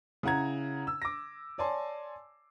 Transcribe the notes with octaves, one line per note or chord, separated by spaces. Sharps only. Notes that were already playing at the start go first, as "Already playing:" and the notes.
C#3 E4 F#5 A#5 G#6
E6
D6 A#6
C#5 D5 G#5 A5 C6